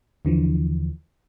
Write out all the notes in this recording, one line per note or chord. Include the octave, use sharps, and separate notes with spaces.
D#2 D3 E3 F3